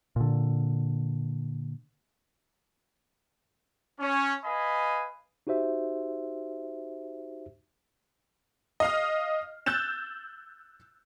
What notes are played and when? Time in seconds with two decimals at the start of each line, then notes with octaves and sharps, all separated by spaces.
0.16 A#2 D3
4.00 C#4
4.45 B4 D#5 F5 G#5 B5
5.47 D#4 F#4 G4 C5 E5
8.80 D#5 F5 F6
9.66 E6 F#6 G6 A6 E7